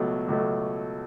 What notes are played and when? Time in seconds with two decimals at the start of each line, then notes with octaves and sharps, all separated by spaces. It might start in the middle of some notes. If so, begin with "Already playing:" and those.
Already playing: C#2 B2 F#3 A3
0.28 C#2 B2 F#3 A3